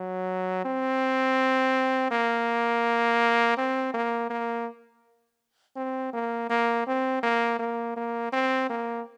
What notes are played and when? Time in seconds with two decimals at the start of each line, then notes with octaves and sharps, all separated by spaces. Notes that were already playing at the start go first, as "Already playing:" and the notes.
Already playing: F#3
0.65 C4
2.11 A#3
3.57 C4
3.94 A#3
4.30 A#3
5.76 C4
6.13 A#3
6.50 A#3
6.87 C4
7.23 A#3
7.59 A#3
7.96 A#3
8.32 C4
8.69 A#3